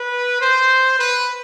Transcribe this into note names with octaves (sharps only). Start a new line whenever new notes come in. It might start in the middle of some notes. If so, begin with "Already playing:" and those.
Already playing: B4
C5
B4